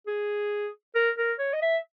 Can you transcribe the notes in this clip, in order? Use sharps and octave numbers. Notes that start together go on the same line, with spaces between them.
G#4
A#4
A#4
C#5
D#5
E5